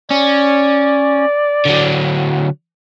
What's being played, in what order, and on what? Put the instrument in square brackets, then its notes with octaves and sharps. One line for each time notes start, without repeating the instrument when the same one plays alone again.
[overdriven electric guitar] C#4 [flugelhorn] D5
[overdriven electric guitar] D3 F#3